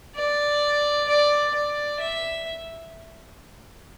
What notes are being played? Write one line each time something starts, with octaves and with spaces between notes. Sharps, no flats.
D5
D5
D5
E5